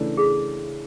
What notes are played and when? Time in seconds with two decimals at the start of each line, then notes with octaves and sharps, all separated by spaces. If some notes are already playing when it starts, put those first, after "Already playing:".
Already playing: C#3 E3 A3 D4 A4
0.17 G#4